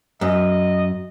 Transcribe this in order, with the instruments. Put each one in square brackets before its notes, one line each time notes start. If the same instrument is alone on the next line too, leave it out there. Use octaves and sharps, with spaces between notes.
[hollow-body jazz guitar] F#2 [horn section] D#5